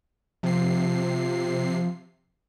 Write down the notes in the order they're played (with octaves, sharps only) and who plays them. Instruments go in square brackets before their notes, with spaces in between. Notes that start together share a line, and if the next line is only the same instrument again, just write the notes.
[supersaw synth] C3 C7 [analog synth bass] F3